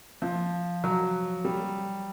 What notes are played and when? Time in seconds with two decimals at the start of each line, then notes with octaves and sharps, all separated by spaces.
0.22 F3
0.84 F#3
1.45 G3